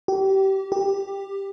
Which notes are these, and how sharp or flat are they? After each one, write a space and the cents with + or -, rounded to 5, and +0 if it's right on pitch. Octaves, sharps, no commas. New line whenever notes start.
G4 -30
G4 +10